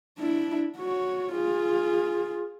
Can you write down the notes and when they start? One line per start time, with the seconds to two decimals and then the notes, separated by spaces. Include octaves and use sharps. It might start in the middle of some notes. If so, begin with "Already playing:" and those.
0.18 D4 E4
0.78 F#4 C#5
1.32 F4 G#4